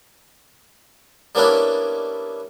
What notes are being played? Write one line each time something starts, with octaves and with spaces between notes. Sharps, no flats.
G3 A#3 B3 C#4 D4 E4